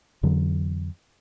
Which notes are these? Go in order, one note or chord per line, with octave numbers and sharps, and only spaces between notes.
F2 D3 E3 F#3